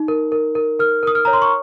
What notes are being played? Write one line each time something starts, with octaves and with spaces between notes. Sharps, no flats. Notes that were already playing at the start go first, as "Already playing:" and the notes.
Already playing: D#4
A#4
A#4
A#4
A#4 F6
A#4 D#6
F6
C#5 A#5
C6
C#6